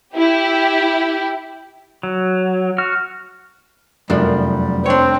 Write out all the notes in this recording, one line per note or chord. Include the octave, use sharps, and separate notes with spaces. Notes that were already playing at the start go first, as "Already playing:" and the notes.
E4 G4
F#3
F#4 F6
F1 F#2 F3 G3 D4 A#4
C4 D4 C#5